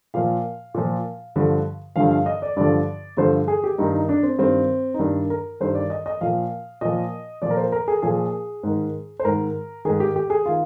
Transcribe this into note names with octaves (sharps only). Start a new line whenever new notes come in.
A#2 F3 F5
A#2 F3
G2 D3 F3
G2 D3 F3 F5
F5
D#5
D5
G2 D3 F3 D5
G2 D3 F3 C5
G#4
G4
G2 D#3 D#4
D#4
D4
C4
G2 D#3 C4
D#4
G2 D#3 D4
A#4
G2 D#3 C5
D5
D#5
D#5
A#2 F3 F5
A#2 F3 D#5
A#2 F3 D5
A#4
C5
A#4
G#4
A#2 F3 G#4
G#2 D#3
C5
G#2 D#3 A#4
G#2 D#3 G#4
G4
G4
G#4
D#3 F4